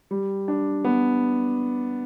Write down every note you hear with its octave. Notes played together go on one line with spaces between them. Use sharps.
G3
D4
B3